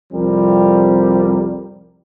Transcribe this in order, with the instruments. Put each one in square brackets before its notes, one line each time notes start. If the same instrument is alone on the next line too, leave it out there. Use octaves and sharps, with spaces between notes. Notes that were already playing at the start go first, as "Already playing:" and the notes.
[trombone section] C2 F2 F3 G3 C4 A#4